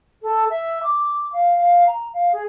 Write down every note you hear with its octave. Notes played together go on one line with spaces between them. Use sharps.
A4
E5
D6
F5
F5
A#5
F5
G#4